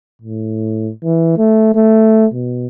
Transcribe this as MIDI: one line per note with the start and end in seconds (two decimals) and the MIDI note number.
0.22 0.91 45
1.04 1.33 52
1.38 1.74 57
1.75 2.26 57
2.33 2.67 47